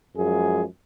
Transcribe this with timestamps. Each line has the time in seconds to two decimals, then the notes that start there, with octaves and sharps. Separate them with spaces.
0.17 F#2 F3 G#3 G#4